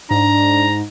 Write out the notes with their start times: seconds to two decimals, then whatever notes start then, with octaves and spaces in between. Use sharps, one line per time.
0.11 G#2 D4 A#5